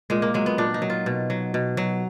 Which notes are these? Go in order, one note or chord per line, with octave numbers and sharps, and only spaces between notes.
A#2 G#3
A#3
F#3 G#3
B3
A#2 D4
D#4
F#3
F4
B2
F#3
B2
F#3